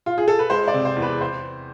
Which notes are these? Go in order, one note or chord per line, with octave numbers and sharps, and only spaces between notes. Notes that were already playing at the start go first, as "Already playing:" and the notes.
F4
G#4
A4
B4
G#3 C5
D5
C3
C5
E2
B4
C5